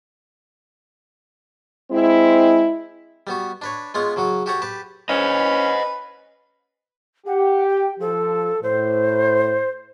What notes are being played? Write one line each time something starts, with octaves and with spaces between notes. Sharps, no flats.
G#3 C4 E4
G3 B3 F#4
D4 B4 C#5
G#3 B3 F4 C#5 F#5
C#3 F#3 F#4
F#4 G4 A4 C#5 F#5
G4 B4 A5
C#4 B4 C5 D#5
G4 F#5
G5
F3 A4
A2 C5